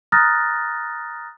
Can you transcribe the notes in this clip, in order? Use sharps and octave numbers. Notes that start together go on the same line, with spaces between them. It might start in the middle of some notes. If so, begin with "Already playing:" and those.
A#5 D#6 F6 F#6 A6 A#6